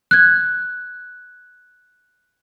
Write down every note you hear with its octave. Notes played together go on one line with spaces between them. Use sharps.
F#6 G#6